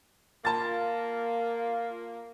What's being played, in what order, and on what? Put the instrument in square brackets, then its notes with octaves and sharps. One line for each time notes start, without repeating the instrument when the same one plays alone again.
[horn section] A#3 [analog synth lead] F4 [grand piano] A5 A6